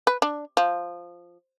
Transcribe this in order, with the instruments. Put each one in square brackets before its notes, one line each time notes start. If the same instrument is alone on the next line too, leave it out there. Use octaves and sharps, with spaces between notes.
[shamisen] B4
D4
F3